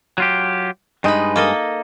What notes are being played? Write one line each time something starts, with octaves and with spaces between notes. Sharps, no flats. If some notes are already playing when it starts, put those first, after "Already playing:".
F#3 F4 G4
G2 G#3 D#4 B4
A#3 A4 D#5